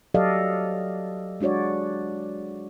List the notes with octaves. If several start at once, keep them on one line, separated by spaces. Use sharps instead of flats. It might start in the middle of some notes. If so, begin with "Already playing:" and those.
F#3 G4 A4 D5 D#5 F5
G#3 D4 F#4 C#5 D5